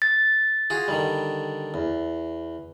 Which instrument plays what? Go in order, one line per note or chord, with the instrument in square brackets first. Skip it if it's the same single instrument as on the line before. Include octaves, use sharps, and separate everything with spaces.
[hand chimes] A6
[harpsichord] F4 F#4 G#4
D3 D#3 G3
E2